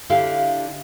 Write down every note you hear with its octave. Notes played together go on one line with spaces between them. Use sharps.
D3 E4 G4 F5